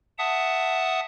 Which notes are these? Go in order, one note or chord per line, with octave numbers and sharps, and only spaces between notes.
E5 F#5 A5 D#6